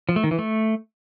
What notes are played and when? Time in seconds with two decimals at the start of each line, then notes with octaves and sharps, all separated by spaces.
0.09 F3
0.16 A3
0.24 D#3
0.31 E3
0.39 A3